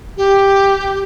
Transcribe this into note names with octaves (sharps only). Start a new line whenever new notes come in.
G4